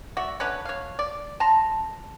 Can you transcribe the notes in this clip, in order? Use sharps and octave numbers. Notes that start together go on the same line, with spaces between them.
F#4 D5 E5
D3 C#4 B4 C#5
C#5 F5
D5
A5 A#5 C6